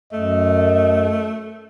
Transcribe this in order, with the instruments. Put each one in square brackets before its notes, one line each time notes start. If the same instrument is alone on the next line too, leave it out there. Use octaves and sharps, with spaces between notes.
[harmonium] F#2 [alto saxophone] A3 [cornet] D#5